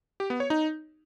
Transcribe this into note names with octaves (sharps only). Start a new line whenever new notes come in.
G4
B3
C#5
D#4